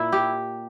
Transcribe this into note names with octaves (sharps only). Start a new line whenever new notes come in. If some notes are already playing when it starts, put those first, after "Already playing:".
Already playing: A#2 A#3 E4
G4